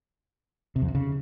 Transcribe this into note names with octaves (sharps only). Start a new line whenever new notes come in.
C3
F2
C3
C#3